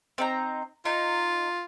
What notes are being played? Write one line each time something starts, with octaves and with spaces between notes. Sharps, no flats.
C4 D#4 A#5
D#4 F4